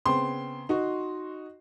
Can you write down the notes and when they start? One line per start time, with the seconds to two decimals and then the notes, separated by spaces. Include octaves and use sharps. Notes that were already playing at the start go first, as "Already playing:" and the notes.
0.06 C#3 B3 C4 C6
0.69 D#4 F#4